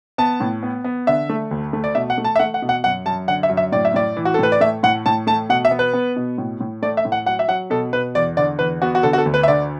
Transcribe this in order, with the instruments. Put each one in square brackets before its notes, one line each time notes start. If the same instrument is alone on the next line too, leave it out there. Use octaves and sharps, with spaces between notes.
[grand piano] B3 A5
A2
B3
B3
D3 E5
A3
D2
A3
D5
B2 E5
F#5
A3
A5
E5
A3 F#5
F#5
B2
F#5
F#2 F#5
F#2 A5
D3 F#5
E5
F#2
E5
A2 D5
E5
A2 D5
E3
F#4
A4
A2 B4
D5
A3 E5
A2 F#5
A2 A5
A3 A5
B2 F#5
E5
B3
B4
B3
B2
A2
A2
A3 D5
E5
A2
F#5
F#3 F#5
E5
F#3 F#5
B2 A4
B2 B4
E2 D5
D3 D5
E2 B4
B3 F#4
F#4
D3 A4
F#4
A4
D2
B4
E5
D3 D5